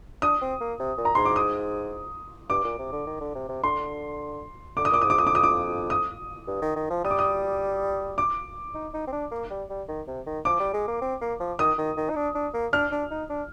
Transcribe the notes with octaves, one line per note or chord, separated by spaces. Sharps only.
D4 D#6
C4
A#3
C3
A#2
A#5
G#2 C6
D6
D#6
G2 D6
A#2
C3
D3
D#3
D3
C3
C3
D3 C6
D3 D6
D#6
A#2 D6
G#2 D#6
D6
F2 D#6
D6
D#6
D6
D#6
G2
D#3
D#3
F3
G3 D#6
D6
D#6
D6
D#4
D#4
C4
D4
A#3
G3
G3
D#3
C3
D#3
F3 D6
G3
G#3
A#3
C4
A#3
F3
D#3 D#6
D#3
D#3
D#4
D4
D4
A#3
D4 F6
D4
D#4
D4